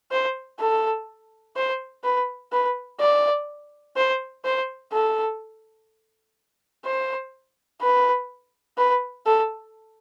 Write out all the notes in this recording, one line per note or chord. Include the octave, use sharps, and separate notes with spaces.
C5
A4
C5
B4
B4
D5
C5
C5
A4
C5
B4
B4
A4